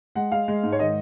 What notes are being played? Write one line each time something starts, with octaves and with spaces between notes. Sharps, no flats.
G#3 F#5
G#3 F5
G#3
G#2
C#5
D#3 D#5